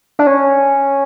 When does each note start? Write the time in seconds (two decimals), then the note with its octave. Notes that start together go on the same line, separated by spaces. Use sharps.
0.19 D4
0.27 C#4